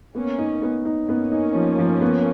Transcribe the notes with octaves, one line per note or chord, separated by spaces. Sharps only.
A#3 B3 C#4
D#4
B3
D#4
A#3 B3 C#4
D#4
F3
F3
B3